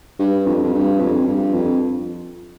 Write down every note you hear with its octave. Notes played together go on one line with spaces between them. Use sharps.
G2
F2
F2
G2
F2
G2
F2